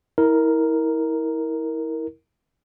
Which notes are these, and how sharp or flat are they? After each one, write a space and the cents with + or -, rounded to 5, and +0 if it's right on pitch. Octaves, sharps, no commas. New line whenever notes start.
E4 -30 A#4 +0